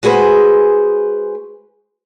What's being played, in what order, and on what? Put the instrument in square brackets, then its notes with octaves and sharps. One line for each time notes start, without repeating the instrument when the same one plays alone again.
[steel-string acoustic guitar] G#3 F#4 G#4 B4 C5